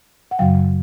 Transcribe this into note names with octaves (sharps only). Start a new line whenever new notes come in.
F#5
F#2 C#3 F#3 F5 G5